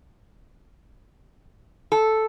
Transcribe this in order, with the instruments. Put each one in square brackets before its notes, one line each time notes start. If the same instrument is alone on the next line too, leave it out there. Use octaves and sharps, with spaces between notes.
[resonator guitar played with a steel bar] A4